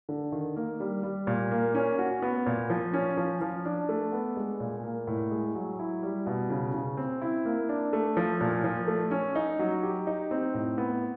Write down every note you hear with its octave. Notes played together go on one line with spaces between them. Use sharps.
D3
D#3
A#3
G3
G3
A#2
A#3
C#4
F#4
B3
A#2
F3
C#4
F3
F3
D4
A3
B3
G#3
A#2
A#3
A2
G#3
F#3
E4
G3
B2
C#3
C#3
C4
E4
A#3
D4
A3
F3
A#2
F3
A3
C#4
D#4
F#3
G4
D#4
C4
A2
B3